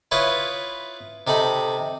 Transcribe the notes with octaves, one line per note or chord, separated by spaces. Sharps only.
E4 F4 B4 C#5 D#6
C3 D#4 A4 B5